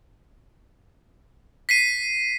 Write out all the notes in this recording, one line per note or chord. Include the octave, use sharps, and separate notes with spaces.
B6 C7 D#7